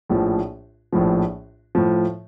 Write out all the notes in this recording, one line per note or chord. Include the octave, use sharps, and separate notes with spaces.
A#1 A2 F3
A#1 A2 F3
A2 F3